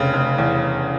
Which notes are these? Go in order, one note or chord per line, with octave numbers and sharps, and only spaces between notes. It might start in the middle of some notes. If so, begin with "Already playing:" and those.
Already playing: F1 C#3
F1
E2